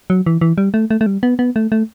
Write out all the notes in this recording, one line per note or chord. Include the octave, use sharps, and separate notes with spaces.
F#3
E3
E3
G3
A3
A3
A3
G3
B3
B3
A3
A3